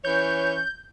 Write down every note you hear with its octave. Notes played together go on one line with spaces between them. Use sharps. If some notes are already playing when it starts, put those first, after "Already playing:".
E3 C#4 C#5 G6